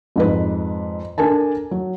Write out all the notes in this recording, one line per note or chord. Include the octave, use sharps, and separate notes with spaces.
F2 G#2 B4
D4 A4 A#4 G#5 A5
F#3